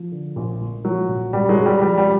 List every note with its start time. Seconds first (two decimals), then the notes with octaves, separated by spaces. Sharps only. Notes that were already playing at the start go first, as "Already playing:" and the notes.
Already playing: F3
0.12 D3
0.36 A#1
0.61 A#2
0.85 F3 F#3
1.09 A#1
1.33 E1 G3
1.49 F#3 G#3
1.57 E1
1.66 G3
1.81 F3 G3
1.98 G3